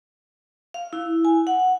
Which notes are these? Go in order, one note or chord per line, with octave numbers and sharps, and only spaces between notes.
F5
E4
G#5
F#5